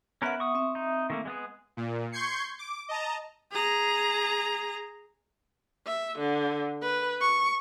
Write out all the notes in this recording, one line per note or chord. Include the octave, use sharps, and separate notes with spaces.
B3 C#4 A#4 B4 E5 F#5
C#6 D#6
C4 E5
D#4
D#3 A3 A#3
G#3 B3 G#4
A#2
C6 C#6 G6 G#6 C7 C#7
D6
D#5 A5 A#5
G#4 A#5
E5
D3
B4
C#6